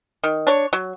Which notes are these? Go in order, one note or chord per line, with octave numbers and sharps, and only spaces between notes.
D#3
D4 C#5
F#3